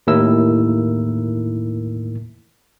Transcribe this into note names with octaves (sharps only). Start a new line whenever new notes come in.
D#2 A2 D#3 E4 A#4 E6